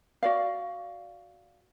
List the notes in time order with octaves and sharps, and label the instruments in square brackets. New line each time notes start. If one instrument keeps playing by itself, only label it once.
[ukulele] F#4 D5 F5